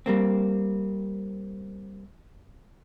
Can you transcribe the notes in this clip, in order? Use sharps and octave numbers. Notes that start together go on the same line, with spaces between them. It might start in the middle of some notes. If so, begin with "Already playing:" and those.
G3 A#3 C4